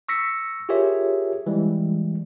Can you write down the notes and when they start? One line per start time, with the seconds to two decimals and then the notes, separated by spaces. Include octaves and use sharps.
0.08 C#6 E6 A#6 B6 C#7
0.69 F4 G4 G#4 A#4 C#5 E5
1.46 E3 G3 G#3